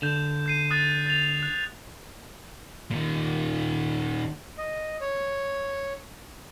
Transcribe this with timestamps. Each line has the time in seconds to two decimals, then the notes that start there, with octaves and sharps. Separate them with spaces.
0.02 D3 G6 E7
0.46 G6 C7 D#7
0.71 D#6 F#6 A6
1.06 A6 F7
1.43 F#6
2.91 A#2 D#3
4.58 D#5
5.01 C#5